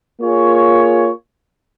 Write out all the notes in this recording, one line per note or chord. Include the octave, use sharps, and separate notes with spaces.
A#3 F4 G#4 C#5